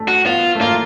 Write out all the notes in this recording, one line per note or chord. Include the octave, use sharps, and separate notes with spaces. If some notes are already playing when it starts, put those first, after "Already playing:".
Already playing: A3
F#4
B3 F4
A3
A#3 F4